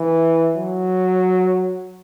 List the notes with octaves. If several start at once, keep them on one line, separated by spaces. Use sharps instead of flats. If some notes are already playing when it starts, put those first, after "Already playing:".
Already playing: E3
F#3